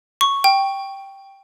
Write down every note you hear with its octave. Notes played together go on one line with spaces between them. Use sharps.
C#6
G5